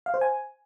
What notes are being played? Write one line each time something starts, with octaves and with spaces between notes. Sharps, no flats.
F5
C5
G#5